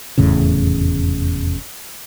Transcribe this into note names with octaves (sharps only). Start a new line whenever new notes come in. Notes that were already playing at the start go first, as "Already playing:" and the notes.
F1 E2 A2 C#3